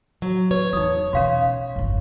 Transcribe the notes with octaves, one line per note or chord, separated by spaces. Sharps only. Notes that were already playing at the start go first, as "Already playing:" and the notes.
F#3
B4 C#5
E2 D#4 D#6
B2 C#4 F5 C6
G1 F2